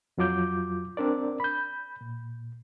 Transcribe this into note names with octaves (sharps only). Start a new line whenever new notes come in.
F2 F#3 F4 D6 G6
C4 D4 A#4 D5
B5 G6
A#2